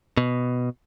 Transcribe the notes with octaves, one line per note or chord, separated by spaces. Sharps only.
B2